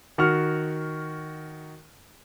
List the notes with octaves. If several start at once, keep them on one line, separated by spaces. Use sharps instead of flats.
D#3 F#4 C#6 F6